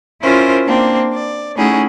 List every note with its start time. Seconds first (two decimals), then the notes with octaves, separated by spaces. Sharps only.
0.22 C#4 E4 F4 A#4 C5
0.66 A#3 C4 D4
1.14 D5
1.56 A3 C#4 D#4 E4 F#4 G#4